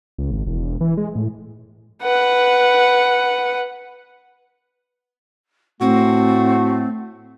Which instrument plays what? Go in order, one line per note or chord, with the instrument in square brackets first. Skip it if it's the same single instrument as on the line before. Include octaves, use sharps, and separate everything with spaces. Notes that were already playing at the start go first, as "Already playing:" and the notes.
[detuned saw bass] C#2
G#1
E1
E3
G#3
A2
[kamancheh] B4 F#5
[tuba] A2 [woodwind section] A3 [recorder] C4 [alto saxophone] F#4